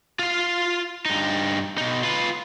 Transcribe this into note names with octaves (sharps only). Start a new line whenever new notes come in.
F4 F5
G2 D#4
B2 D#4
F4 B4